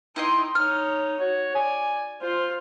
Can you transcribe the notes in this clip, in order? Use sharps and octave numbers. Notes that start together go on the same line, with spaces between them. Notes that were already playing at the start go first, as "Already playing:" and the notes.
D#4 E4 D#5 G5 C6
D#4 C#5 F6
F#4 C#5
D5 G#5
F4 C5